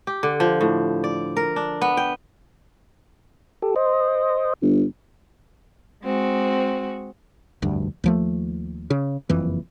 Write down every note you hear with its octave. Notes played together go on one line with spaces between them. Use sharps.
G4
D3
F3
A2
D5
A#4
D4
B3
G5
G4 A4
C5 D#5
G1
G#3 C4 F#4
F1 D2 G2
D#2 F3 A3
C#3
F#1 F2 E3